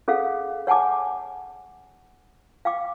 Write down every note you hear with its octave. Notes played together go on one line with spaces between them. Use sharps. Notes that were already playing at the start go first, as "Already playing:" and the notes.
C#4 G#4 A4 C#5 F5 F#5
C#5 F#5 G#5 A5 D6
F5 G5 D6